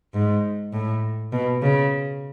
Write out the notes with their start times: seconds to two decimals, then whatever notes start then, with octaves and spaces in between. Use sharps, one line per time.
0.14 G#2
0.73 A2
1.32 B2
1.62 C#3